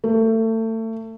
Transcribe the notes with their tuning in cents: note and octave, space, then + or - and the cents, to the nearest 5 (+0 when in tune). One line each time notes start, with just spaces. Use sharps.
A3 +30